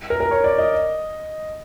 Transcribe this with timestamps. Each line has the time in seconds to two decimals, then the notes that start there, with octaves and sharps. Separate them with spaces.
0.10 A#4
0.20 A#4
0.31 C#5
0.44 D5
0.58 D#5